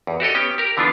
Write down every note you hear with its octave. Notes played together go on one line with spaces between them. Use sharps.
E2
F#4 G4 A4 D#5
B3 C#4 G4 G5
G4 A#4
D3 E3 B3 D4 F4